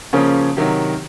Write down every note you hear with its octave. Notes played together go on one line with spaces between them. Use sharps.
C#3 F3 A#3 C#4
C3 D#3 F#3